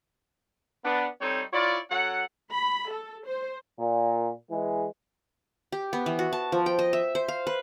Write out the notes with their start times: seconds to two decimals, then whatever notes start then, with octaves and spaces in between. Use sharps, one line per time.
0.85 B3 D4
1.21 G3 C4 D#4 A4 C5 C#5
1.53 E4 F4 C#5 D5
1.91 F#3 C#4 A4 F#5
2.53 B5
2.91 A4
3.27 C5
3.79 A#2
4.50 E3 G#3
5.72 G4
5.93 B3
6.06 E3
6.19 F#4
6.33 A5
6.52 F3
6.66 G5
6.79 D#5
6.93 E5
7.15 C5
7.28 F5
7.47 B4